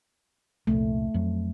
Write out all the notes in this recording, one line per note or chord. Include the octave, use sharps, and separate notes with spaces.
C2 F2 A#2 A3
F2 F#3